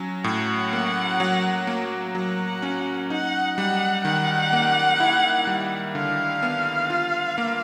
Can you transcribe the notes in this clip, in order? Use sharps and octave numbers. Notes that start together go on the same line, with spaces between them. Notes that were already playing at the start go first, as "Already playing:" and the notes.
Already playing: F#3 C#4
A2 F#5
A#3
F#3
A#3
F#3 F#5
C#4
D#4 F#5
G3 F#5
D#3 F#5
A#3
E4
G3
D3 F5
B3
F4
A#3